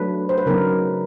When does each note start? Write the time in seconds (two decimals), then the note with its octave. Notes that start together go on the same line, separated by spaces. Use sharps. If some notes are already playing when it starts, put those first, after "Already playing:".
Already playing: F#3 A3 D4 B4
0.29 C5
0.38 B4
0.46 C#3 F#3 B3 D#4 A#4